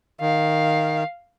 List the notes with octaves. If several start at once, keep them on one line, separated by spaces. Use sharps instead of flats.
D#3 F5